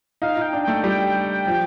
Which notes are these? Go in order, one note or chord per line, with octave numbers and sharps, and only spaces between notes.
D#4 F5
D#4 G5
D4
A3 G5
G3 G5
F3